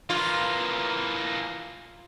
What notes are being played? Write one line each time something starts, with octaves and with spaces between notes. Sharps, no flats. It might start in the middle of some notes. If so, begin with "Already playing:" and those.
E3 A#3 F4